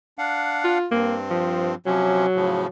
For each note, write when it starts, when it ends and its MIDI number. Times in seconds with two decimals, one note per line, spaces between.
0.18 0.78 62
0.18 0.78 77
0.18 0.78 78
0.64 0.86 65
0.91 1.75 43
0.91 1.17 58
0.91 1.75 60
1.30 1.72 53
1.86 2.26 48
1.86 2.26 53
1.86 2.67 54
1.86 2.26 61
2.35 2.67 45
2.35 2.67 49
2.35 2.67 53